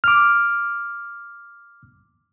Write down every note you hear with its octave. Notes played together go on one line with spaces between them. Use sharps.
D6 F6